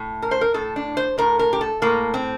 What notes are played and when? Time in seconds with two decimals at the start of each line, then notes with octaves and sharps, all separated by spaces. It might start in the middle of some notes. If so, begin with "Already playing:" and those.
Already playing: A2
0.22 A#4
0.31 C5
0.41 A#4
0.54 A2 A4
0.76 D4
0.97 C5
1.18 A2 A#4
1.39 A#4
1.53 G4
1.61 A4
1.82 A2 A#3
2.14 C4